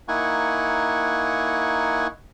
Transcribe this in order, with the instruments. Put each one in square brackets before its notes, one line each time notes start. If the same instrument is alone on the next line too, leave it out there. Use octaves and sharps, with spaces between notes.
[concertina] A#3 D#4 E4 F#5 G#5 C#6